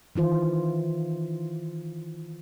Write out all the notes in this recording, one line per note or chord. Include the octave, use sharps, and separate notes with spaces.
D#3 E3 F4 C5